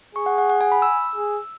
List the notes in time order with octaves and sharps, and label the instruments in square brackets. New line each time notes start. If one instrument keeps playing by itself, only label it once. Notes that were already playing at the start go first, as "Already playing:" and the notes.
[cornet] G#4 [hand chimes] C#6
[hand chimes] F#5
F#5
F#5
G#5
B5
E6
[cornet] G#4